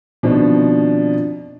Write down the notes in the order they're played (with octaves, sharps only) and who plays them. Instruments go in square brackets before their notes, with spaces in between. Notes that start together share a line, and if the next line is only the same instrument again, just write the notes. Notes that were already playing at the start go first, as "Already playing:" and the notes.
[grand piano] B2 D#3 F3 C4 D4 D#4